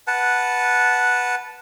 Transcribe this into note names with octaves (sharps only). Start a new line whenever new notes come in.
B4 F#5 A5